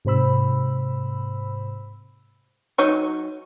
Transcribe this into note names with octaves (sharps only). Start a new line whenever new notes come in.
G#2 C3 C5 B5 E6
F#3 D#4 C#5